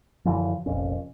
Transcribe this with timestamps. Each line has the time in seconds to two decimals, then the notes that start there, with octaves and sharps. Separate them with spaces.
0.25 F#2 D3 E3 F3
0.66 F1 A#1 F2 C#4